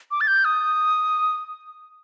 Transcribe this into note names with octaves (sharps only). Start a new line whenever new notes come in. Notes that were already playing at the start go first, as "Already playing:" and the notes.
D6
A6
G6
D#6